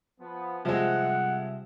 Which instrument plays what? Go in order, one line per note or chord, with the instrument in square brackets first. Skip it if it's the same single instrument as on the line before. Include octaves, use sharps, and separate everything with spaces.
[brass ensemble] F3 B3
[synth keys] C3 G3 E5 [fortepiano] F3 G#3 [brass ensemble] F#5